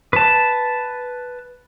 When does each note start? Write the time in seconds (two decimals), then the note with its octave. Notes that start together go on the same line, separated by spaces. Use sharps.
0.13 B4 A5